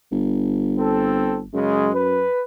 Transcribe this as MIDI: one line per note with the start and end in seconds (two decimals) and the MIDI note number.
0.11 1.47 31
0.78 1.37 60
0.78 1.37 69
1.54 2.25 42
1.54 1.90 49
1.54 1.90 56
1.93 2.42 71